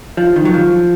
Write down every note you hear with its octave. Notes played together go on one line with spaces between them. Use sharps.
F3
D#3
F#3
F3